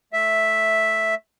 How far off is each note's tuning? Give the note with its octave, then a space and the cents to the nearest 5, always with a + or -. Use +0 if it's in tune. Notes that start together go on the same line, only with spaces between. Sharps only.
A3 -10 E5 +0